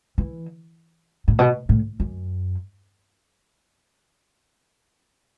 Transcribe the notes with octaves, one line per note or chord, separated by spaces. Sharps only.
E3
A2
B2
A2
F#2